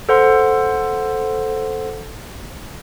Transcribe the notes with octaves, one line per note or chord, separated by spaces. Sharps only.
A4 C5 F#5 C6